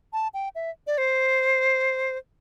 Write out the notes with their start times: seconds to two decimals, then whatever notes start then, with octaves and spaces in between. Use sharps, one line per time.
0.13 A5
0.34 G5
0.55 E5
0.87 D5
0.98 C5